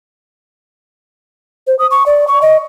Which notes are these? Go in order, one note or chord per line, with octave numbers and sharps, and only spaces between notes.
C5
D#6
C#6
D5
C#6
D#5